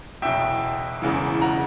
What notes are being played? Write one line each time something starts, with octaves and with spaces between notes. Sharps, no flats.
F#1 E2 B2 E5 G5
E1 E2 C#3 E3
F#5 A#5